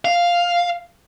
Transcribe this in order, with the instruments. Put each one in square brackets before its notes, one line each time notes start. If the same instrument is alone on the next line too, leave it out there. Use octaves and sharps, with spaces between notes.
[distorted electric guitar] F5